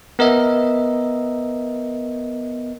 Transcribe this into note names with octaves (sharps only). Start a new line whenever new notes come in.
B3 A#4 D#5 E5